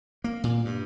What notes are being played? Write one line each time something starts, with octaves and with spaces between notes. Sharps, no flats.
A#3
A#2
G2